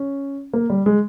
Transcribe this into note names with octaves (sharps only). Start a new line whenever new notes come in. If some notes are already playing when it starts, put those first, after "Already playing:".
Already playing: C#4
A#3
G3
G#3